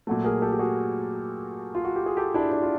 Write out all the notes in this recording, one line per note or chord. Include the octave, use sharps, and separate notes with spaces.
A#2 F#3 A3
G#4 A#4
G4 A4
G4
F#4 G#4
F4
F#4
G4
G#4
G4 A4
D4 E4
D4 E4
F4